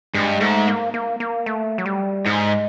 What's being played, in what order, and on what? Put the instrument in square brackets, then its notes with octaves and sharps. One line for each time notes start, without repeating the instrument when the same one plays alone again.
[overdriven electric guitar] G2 [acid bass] G#3
[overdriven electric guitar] G#2 [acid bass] A3
[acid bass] A#3
A#3
A#3
A3
F#3
G3
[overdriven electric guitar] G#2 [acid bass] G#3